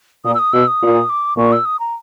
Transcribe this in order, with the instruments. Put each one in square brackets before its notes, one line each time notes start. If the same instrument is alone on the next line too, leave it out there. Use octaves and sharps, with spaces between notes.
[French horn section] A#2 [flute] D#6
[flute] E6
D#6
[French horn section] B2 [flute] E6
[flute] D#6
[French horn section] A#2
[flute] D6
[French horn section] A#2 [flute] C#6
[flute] E6
D#6
A#5